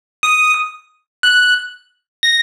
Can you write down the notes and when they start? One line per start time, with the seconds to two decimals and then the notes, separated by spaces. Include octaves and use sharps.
0.23 D#6
1.23 F#6
2.23 A#6